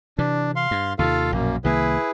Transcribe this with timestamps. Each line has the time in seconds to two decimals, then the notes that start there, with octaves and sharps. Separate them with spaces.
0.19 C3 E3 D4
0.56 F5 C6
0.71 G2
0.99 D#2 C3 D#3 F4 A4 F5
1.32 A#1 F#2 B2 A#3
1.64 C2 D#3 A#3 E4 G#4 B4